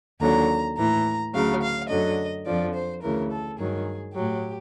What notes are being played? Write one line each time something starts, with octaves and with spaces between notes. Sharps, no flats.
D#2 D3 F#3 A#5
A2 E3 A#5
D2 C#3 F#3 F5
F5
F#2 D3 F#3 D#5
F2 D3 F3 D5
C5
D2 C#3 E3 A#4
A4
G2 D#3 F#3 G#4
A2 F#3 G4